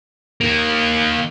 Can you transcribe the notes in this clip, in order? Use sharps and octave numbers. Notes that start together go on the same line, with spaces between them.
D#3 A#3